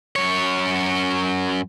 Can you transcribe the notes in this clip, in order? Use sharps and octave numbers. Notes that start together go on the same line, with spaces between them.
F#2 C#5